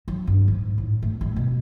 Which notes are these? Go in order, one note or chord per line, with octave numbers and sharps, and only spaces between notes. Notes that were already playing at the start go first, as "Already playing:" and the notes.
F#3
G2
G#2
A2
A3
G3
B2